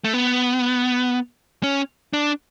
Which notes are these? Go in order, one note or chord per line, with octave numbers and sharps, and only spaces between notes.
A3
B3
C#4
D4